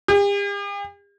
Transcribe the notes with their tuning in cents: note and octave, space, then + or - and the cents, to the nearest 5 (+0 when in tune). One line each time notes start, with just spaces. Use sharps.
G4 +45